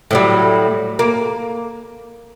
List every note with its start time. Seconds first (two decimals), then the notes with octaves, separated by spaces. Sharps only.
0.11 A2 F#3 G3
0.99 A#3